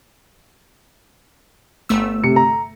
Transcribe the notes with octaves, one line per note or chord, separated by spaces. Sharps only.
G1 A3 E6
C3 C#7
A#5